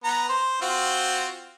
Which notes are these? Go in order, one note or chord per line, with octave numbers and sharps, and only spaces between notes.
B3 A#5
C5
C4 F4 F#4